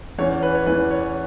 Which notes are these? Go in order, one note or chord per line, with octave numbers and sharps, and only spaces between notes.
E2 E3 C#4 C#5
B4
C#5
E2 E3 C#4 B4
C#5